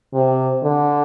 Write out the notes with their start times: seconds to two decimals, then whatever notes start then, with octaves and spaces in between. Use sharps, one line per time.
0.14 C3
0.63 D3